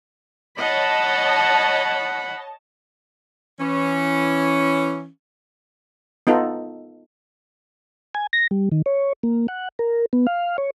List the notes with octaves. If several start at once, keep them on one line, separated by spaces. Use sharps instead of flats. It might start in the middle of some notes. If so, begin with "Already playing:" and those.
C#5 D#5 F#5 A5 B5
E3 C#4
B3 D#4 F4 A4
G#5
A#6
G3
D#3
C#5
A#3
F#5
A#4
B3
F5
C#5